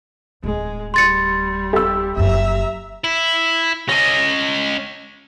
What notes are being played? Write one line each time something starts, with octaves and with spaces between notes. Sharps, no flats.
D1 G#3 A3
G3 C6 A6 C#7
G4 E6
F#1 F#2 E5 A#5
E4
C#4 D#5 A#6